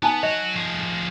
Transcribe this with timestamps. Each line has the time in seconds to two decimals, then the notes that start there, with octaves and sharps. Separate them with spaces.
0.03 B3 D#4 G#5 A5
0.23 F#4 C#5 D#5
0.56 F3 G#4